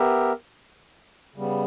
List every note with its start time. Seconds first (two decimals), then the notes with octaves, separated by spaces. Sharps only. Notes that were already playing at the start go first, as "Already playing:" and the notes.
Already playing: B3 G4 A#4 E5
1.36 C#3 G3 B3